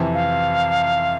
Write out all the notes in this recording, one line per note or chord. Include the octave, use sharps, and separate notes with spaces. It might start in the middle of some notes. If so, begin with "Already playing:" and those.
Already playing: F2 C3 E3
F5